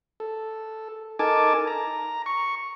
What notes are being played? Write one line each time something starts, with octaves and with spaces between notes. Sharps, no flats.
A4
D#4 A4 A#4 G#5 A5 D6
A#5
C#6